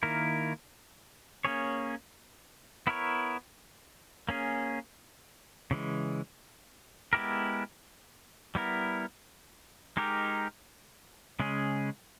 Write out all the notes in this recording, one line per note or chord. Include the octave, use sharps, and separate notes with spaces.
D#3 A#3 E4 A#4
A#3 C#4 G#4 C#5
B3 E4 A#4 C#5
A#3 C#4 G#4
C#3 E3 G#3
G#3 B3 E4 G4 A#4
G3 B3 E4 A#4
G#3 D#4 G4 A#4
C#3 G#3 C#4 G#4